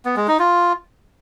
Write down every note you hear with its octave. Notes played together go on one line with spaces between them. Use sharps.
B3
G#3
D#4
F4